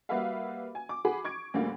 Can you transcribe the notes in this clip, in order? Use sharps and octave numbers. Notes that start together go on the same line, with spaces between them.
G3 A#3 F#4 B4 E5 F5
G#5
D6
F#4 G#4 B5
C#6 G#6 D7
D2 A2 D3 G3 A#3